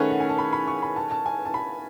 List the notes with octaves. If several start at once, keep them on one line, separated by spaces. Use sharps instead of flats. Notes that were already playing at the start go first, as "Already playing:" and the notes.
Already playing: D#3 A3 C#4 G#4 B4 F#5
F#5
G#5
A5
B5
B5
C#6
B5
A5
A5
G#5
A5
B5